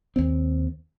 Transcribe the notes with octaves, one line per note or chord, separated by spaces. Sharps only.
D#2 C4